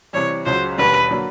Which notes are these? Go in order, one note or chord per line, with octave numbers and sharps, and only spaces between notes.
C3 E3 G3 C#5
C#2 C#3 F#3 C5
E1 D#2 D3 G3 B4
D3 F#3 A#3